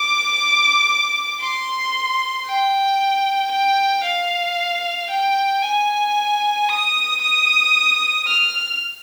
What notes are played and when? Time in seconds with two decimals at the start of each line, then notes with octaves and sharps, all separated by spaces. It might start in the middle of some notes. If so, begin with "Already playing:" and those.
Already playing: D6
1.41 C6
2.46 G5
3.52 G5
4.04 F5
5.10 G5
5.62 G#5
6.69 D#6
7.21 D#6
8.27 F6